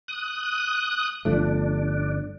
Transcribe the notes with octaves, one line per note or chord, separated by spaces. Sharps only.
D#6 F#6
G1 F3 A3 D4